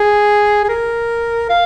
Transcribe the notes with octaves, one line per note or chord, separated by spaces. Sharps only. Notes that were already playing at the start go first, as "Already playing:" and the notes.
Already playing: G#4
G#4
A#4
F5